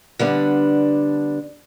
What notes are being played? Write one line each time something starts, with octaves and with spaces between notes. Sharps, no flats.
D3 G3 B3 D4